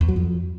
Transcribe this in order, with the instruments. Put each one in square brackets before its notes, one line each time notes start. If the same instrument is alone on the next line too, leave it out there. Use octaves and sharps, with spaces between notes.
[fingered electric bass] E2
F#3
F2